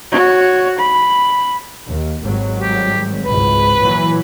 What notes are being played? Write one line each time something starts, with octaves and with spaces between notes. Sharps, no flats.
F#4 C#5
B5
D#2
G#1 F#3 G3
G4
G#1 C#2 G#2 B4
A#2 E3 F#3